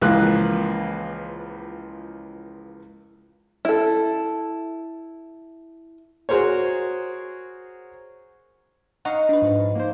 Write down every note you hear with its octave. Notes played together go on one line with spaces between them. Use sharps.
C#2 E3 F3 A#3 F#6
E4 A4
F#4 G#4 A#4 C5 C#5
D#4 F5 F#5 A#5 C#6
D4 B4
G#2 F3
A#3 D#4 C5